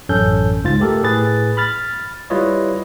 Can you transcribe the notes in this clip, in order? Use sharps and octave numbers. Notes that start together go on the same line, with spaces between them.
A1 F#2 C#4 A4 G6
C#2 G#2 F4 A6
A3 G4 A4 A#4
A2 G#4 B4 A6
B5 F6 A6
G3 E4 F4 B4 C#5 D#5